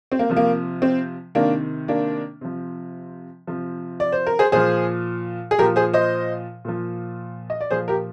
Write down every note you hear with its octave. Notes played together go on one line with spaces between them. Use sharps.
C4
A#3
C3 F3
A#3
C4
C3 D#3 A#3 D4
A#3 D4
C3 F3
C3 F3
D5
C5
A#4
G#4 C5
A#2 F3 G#4 C5
G#4
A#2 F3 G4 A#4
G#4 C5
C5 D#5
A#2 F3
D#5
D5
A#2 F3 G#4 C5
G4 A#4